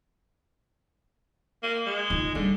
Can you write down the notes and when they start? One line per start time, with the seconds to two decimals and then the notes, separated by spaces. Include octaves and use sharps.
1.63 A#3
1.86 G#3
2.10 D#3 F4
2.35 D3 G3 A3